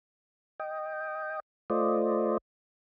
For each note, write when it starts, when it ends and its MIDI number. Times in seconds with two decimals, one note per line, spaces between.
0.60 1.40 75
0.60 1.40 79
1.70 2.38 57
1.70 2.38 65
1.70 2.38 72
1.70 2.38 74
1.70 2.38 75